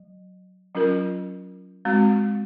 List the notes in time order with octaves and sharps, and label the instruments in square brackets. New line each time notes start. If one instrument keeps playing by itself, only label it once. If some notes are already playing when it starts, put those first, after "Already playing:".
Already playing: [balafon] F#3
F#3 C#4 F4 A#4
G#3 C4 F#4